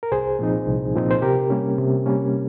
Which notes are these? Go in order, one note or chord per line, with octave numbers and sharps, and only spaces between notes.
A#4
C2 G#4 C5
A#2 F3 C4 D#4
C2
A#2 F3 C4 D#4
C5
C3 G4 A#4
G3 A#3 C#4
C3
G3 A#3 C#4